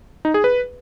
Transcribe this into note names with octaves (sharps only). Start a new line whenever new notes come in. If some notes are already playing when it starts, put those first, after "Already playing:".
D#4
G#4
B4